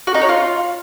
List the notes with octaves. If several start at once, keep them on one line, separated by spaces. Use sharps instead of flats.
F#4
D#4
C#5
F4